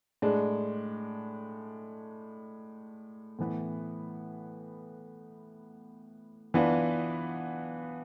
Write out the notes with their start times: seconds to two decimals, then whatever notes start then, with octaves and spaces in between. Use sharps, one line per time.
0.22 A2 G#3 D4
3.39 A2 E3 B3
6.54 E3 B3 D4 F4